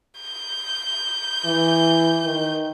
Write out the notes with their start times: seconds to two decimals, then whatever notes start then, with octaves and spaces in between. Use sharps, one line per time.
0.21 G6
1.45 E3
2.25 D#3